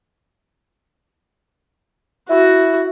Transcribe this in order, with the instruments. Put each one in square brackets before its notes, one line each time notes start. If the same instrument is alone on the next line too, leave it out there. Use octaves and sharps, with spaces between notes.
[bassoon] E4 [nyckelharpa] F#4